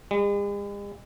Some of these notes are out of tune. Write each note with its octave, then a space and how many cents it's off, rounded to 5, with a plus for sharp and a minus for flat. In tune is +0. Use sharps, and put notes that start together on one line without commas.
G#3 -45